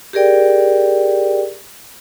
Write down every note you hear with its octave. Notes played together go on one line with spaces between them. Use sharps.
G4 G#4 A#4 D5 G5